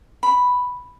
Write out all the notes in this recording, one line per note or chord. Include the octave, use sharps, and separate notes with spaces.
B5